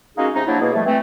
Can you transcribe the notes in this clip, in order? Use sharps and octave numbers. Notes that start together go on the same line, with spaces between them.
G#3 A#3 C#4 D#4 F#4 G#4
C3 G#3 C#4 D#4
F3 F#3 A#3 D4 E4
B2 A#3 G#4
A2 C3 F3 G3 A3
E3 A3 C4